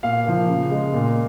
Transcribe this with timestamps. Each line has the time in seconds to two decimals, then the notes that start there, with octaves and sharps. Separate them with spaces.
0.03 A#2 F5
0.26 F3 A#3
0.48 C#3
0.71 G#3
0.94 A#2